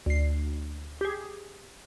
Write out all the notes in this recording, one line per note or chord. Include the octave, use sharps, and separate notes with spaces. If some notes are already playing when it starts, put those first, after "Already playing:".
D2 C7
G4 G#4